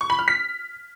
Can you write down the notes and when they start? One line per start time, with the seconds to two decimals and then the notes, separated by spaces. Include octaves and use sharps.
0.01 C#6
0.10 B5
0.19 F6
0.28 B6